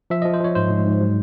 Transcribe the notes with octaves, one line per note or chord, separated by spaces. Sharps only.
F3 E5
F3 D#5
C5
F3 C#5
G#2 C5
G#2
G#2
F#3